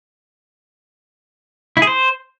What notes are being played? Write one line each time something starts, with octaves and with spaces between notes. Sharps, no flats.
E4
G#4
C5